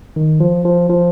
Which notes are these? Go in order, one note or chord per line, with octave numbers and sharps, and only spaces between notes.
D#3
F3
F3
F3